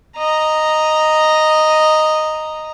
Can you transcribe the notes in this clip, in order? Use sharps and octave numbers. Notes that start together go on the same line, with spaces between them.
D#5 A#5